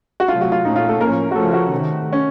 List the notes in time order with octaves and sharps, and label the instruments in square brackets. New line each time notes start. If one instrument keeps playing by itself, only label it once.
[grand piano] F#4
[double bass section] C3 F#3 A3 [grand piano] F4
[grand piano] F#4
F4
[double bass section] A#2 A3 C#4 [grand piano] D#4
[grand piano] F4
A4
[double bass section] A2 F3 A#3 C#4 [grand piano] A#4
[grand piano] F#4
[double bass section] C#3 F3 A3 C#4 [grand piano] A4
[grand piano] F#4
[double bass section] C3 D#3 A3
[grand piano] C#4